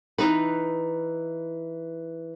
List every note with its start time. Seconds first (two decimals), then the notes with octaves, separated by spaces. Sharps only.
0.18 E3 D#4 B4